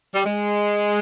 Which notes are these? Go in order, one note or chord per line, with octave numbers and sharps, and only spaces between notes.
G3
G#3